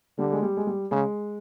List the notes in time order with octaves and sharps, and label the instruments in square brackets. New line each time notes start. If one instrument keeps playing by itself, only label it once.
[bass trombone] D3 [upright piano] G3
[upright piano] G#3
G3
G#3
G3
[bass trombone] C#3 [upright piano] G#3